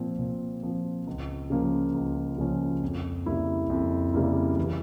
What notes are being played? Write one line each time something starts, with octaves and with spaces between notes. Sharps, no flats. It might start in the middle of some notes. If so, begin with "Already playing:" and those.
Already playing: A#2 F3 C4
A#2
F3 C4
C#2
C#3 F3 A#3 C#4
C#2
C#3 F3 A#3 C#4
F2
C#3 G3 A#3 E4
F2
C#3 G3 A#3 E4
E3